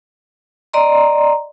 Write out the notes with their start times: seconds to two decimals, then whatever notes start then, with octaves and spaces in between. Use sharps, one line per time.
0.73 D5 D#5 A#5 C6